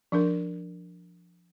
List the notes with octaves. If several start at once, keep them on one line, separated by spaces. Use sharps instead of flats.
F3 D4 A#4